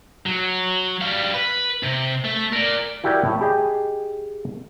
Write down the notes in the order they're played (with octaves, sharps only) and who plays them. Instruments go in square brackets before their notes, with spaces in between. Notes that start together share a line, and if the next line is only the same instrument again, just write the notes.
[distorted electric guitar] F#3
G3 F5
B4
C3
A3
A#4 D5
[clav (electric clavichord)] E4 F#4 G4 A#4 D5 F#5
A2
G4 G#4 D#5